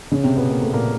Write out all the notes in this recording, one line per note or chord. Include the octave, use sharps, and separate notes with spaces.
C#3 C#4
C3 C4
B2 B3
A#3
A3
A#2 A#3